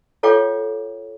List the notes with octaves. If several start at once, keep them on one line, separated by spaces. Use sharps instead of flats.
F4 A4 C#5 F5 G5 D6